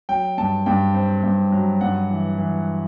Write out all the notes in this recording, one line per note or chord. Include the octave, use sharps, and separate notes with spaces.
F#3 G5
G2 A5
G2 G5
C4
G2
F#3
G2 F#5
E3
E3